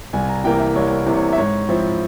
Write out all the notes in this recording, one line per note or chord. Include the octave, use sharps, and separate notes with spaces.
C2 G#5
A#5
C3 E3 A#3 G5
E5
C2 C#5
C3 E3 A#3
C#5
E5
G#2 C#5
F3 C4 E4